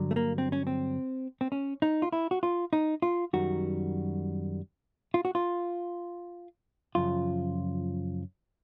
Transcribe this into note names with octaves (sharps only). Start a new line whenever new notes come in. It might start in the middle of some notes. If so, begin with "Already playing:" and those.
Already playing: G2 D3 F#3
A3
A#3
C4
C#4
C4
C4
C#4
D#4
F4
E4
F#4
F4
D#4
F4
F#2 D#3 G3 F#4
F4
F#4
F4
F#2 C#3 F3 F4